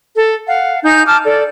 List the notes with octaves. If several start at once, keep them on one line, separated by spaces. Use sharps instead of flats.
A4
F5 F#5
D#4 G#5 G6
A5 D6 F6
A4 D5